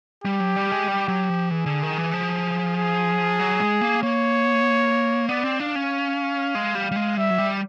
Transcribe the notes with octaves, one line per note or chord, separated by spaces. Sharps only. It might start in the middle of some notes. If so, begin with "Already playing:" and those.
G3 G4
F#3
G3
G#3
G3
F#3
F3
E3 G#4
D3
D#3
E3
F3
G#4
F#3
G#3
A#3
A#3 C#5
B3 D5
C4
D4 F5
C#4
G#3
G3
G3
G#3
G3 E5
F#3
G3